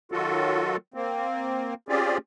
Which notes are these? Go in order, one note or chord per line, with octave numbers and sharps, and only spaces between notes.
D#3 F#3 F4 F#4 A4
A#3 C4
C4 C#4 F4 G4 G#4 D5